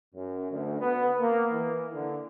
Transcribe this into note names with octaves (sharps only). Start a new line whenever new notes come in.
F#2
D2
B3
A#3
E3
D3